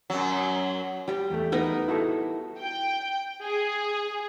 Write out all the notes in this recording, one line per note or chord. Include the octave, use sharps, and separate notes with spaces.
F#2 F#3
G3 G4
E2 A3
B3 D#4 A#4
E4 F#4 A4
G5
G#4